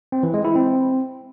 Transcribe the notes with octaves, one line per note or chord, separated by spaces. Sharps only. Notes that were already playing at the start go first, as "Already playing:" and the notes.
C4
E3
G#3
E4
C4